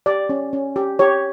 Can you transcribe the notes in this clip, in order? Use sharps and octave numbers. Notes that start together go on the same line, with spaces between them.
G4 D5
C#4
C#4
G4
G4 C#5